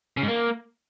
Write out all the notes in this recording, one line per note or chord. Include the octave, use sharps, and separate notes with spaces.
C#3
G#2
A#3